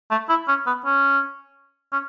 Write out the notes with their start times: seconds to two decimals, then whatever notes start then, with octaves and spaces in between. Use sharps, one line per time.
0.11 A3
0.29 E4
0.48 C#4
0.67 B3
0.85 C#4
1.92 C#4